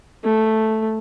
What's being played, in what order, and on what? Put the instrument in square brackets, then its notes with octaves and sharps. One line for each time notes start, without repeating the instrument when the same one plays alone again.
[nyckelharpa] A3